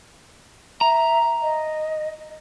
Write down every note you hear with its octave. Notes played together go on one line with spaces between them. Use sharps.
E5 A#5
D#5